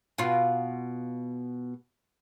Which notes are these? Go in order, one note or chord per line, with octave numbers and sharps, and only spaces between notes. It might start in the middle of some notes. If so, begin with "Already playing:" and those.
B2 F4